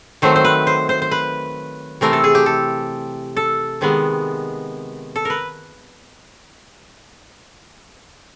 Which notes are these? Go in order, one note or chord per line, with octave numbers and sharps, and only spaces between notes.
D#3 F#3 A3 C4 C5
C5
B4
C5
C5
C5
B4
C3 E3 A3 C4 A#4
A4
G#4
G4
A4
A4
C3 D#3 G#3 B3
A4
A#4 B4